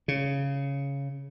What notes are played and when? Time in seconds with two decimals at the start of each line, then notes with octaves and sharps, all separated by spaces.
0.08 C#3